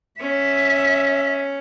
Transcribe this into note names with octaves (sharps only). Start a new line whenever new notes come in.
C#4 E5